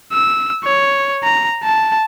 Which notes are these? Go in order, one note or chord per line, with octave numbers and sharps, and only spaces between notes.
E6
C#5
A#5
A5